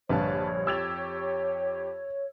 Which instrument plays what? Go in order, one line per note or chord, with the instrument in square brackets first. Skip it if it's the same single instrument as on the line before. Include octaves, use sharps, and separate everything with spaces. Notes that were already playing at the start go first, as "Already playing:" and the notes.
[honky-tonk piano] A#1 G2 D3 [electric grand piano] B4 F5 A5 [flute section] C#5
[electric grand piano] F2 G4 A6 [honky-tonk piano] E6 G#6 F7